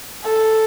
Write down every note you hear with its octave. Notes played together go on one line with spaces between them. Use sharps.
A4